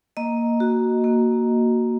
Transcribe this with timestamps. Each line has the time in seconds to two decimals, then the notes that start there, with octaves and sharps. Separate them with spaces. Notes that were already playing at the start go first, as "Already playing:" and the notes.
0.17 A#3 D#5
0.60 F#4
1.04 A#3